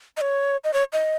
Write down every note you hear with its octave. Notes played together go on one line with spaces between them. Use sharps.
D#5
C#5
D#5
C#5
D#5